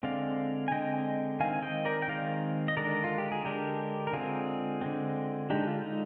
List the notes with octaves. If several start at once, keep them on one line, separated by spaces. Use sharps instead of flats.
D3 G#3 C4 D5 F5
G#5
D3 G#3 C4 D#5 G5
D#3 G#3 C4 F5 G#5
D#5 G5
A#4 D5
G5
D#3 G#3 C4 D5 F5
D#5
D3 G#3 D4 A#4 D5
F4
G4
G#4
D3 G#3 D4 G4 A#4
A#4
D3 G#3 C4 F4 G#4
D3 G#3 C4
D3 G#3 D4 D#4 G4
F4
D#4